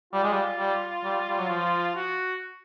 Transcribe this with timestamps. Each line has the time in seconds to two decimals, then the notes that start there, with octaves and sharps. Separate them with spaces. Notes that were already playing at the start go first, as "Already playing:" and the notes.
0.13 G3 F4
0.24 G#3
0.33 G3
0.58 G3
1.04 G3
1.29 G3
1.39 F#3
1.50 F3
1.95 F#4